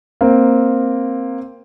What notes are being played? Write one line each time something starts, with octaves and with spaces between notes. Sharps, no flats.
A#3 C4